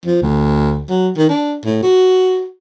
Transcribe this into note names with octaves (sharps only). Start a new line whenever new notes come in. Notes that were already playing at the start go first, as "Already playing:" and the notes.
F3
D2
F#3
D#3
D4
A2
F#4